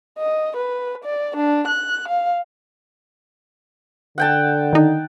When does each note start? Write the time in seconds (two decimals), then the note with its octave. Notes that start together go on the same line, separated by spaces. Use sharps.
0.18 D#5
0.56 B4
1.04 D5
1.36 D4
1.67 F#6
2.08 F5
4.18 D3 F#5 G5 A5
4.73 D#3 D#4